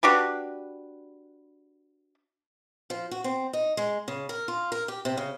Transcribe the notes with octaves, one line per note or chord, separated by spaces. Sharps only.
D4 F#4 G4 B4
F3
F#4
C4
D#4
G#3
C#3
A#4
F4
A#4
G4
C3
C#3